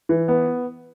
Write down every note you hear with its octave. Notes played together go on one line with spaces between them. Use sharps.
E3
B3